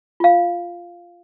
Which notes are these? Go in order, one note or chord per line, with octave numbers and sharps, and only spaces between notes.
F4 F5